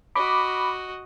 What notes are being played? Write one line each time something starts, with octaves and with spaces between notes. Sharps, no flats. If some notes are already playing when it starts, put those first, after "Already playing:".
F#4 D#5 B5 D6